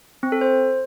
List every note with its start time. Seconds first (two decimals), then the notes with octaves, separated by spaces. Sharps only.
0.23 C4
0.32 A4
0.41 C5